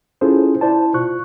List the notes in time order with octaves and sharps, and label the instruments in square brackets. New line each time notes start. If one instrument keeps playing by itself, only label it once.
[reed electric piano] C#4 E4 F4 G#4 A4 C5
E4 C5 D5 A5
B2 F4 C#6 F#6